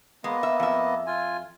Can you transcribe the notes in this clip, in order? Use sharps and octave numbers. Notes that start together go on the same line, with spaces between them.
G#3 A#3 B3 D#5
E5
F2 E5
F4 G#5